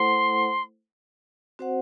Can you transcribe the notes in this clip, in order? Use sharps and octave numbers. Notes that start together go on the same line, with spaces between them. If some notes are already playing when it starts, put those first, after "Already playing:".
Already playing: A3 E4 A4 C5 F#5 C6
C4 F#4 C5 F#5